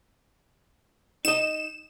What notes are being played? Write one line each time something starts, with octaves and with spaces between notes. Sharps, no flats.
D#4 D#5 E7